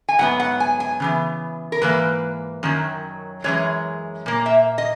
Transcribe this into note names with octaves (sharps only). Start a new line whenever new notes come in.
G#5
G#2 F#3 B3 F#5
F#5
G#5
G#5
C#3 E3 B3
A#4
G#2 E3 A#3 B4
F#2 D#3 F#3
F#2 E3 G#3 C#5
A#2 A#3
E5
D#5